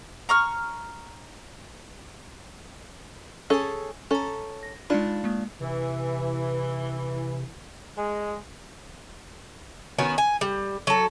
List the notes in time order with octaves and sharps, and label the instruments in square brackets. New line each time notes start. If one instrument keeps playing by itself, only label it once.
[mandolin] A#5 C#6 F6
[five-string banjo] C#4 G#4 A4 [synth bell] G#5 E6
[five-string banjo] C#4 A4 [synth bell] G#5 A#5
[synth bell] A#6
[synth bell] G#3 D#4 B5 [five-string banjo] D4 F4
[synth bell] G#3 A#3
[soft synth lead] C3 [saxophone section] E3
[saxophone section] G#3 [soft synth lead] G#5
[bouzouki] D#3 B3 C#4 F#4
G#5
G3
F#3 A4